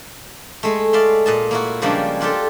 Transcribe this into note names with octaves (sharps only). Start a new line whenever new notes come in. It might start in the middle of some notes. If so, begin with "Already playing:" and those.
G#3 A3
D5 E5 F5 C6
A#2 D#5 A5
A#3 E4 F#4
C#3 F3 G3 G#3 A#3 D4
D4 F4 G4 A4